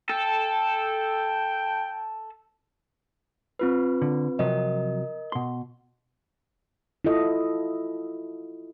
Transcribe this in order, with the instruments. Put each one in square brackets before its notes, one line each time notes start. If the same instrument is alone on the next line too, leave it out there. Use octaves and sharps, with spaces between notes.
[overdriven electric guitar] A4 [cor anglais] G5
[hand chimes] C4 F4 B4
[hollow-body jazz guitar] D3
[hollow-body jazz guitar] C3 F3 F#3 [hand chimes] A#4 D#5
[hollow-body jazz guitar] B2 C6
[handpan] E4 F4 A4 D#5